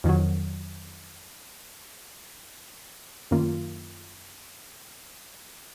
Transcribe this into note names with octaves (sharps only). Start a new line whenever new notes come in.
F2 D#3 F#3
F#2 D#3 A#3 F4